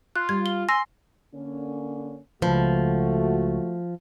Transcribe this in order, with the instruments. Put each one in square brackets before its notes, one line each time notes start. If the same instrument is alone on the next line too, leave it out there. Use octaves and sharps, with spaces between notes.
[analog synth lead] F4 [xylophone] F#6
[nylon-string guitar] G3 [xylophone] G#6
[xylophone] G7
[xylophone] G#5 E6 A#6 [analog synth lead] C6
[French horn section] D3 A#3 C#4
[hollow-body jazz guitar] C#2 F#2 B4 [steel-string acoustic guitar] F3 [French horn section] A3 F#4